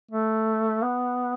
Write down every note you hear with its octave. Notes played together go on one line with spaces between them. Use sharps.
A3
B3